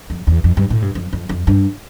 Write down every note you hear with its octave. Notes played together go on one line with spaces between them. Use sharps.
F2
E2
F2
G2
A2
G2
F2
F2
F2
G2